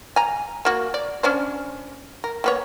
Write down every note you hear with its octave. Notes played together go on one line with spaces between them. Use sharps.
G#5 A#5
A#3 F#4
D5
C#4 D4 C5
A#4
A#3 B3 C#5